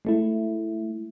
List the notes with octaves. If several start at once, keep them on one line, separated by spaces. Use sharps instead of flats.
G#3 A3 E4